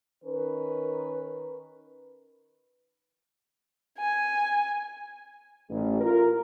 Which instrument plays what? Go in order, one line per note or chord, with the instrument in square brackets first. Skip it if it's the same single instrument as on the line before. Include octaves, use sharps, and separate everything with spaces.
[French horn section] D#3 C#4 A#4 B4
[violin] G#5
[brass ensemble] A1
F4 A#4